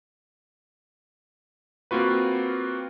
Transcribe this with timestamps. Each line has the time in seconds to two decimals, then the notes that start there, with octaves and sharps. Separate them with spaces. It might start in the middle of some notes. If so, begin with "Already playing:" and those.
1.91 A#3 C4 F4 F#4 B4